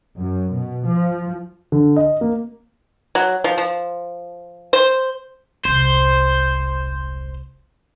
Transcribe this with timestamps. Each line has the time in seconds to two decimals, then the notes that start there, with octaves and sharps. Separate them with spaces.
0.16 F#2
0.51 B2
0.85 F3
1.72 D3
1.96 D#5
2.21 A#3
3.15 F#3
3.44 F3
3.58 F3
4.73 C5
5.65 E1 C2 C5